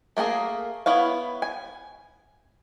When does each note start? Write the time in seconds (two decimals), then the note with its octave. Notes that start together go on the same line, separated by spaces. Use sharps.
0.17 A3 A#3 F#4 G#4 A#4
0.86 B3 E4 C#5 F5
1.42 G#5